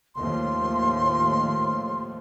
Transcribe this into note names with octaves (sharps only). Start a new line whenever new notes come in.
D#2 A2 F3 C6